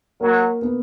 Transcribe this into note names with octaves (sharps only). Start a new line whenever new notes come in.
F#3 A#3 A#4
B3 B4